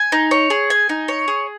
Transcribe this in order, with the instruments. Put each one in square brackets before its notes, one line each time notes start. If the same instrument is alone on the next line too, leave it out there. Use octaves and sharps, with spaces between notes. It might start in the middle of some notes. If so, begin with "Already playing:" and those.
Already playing: [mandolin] G#5
D#4
C#5
G#4
G#5
D#4
C#5
G#4